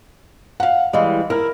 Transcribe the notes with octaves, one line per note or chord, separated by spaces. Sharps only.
F5 F#5
E3 G3 G#3 F5
E4 A#4 F6